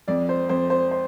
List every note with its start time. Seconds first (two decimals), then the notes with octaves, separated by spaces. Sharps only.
0.08 F2 D5
0.29 C5
0.49 F2 C5
0.70 C5
0.91 C5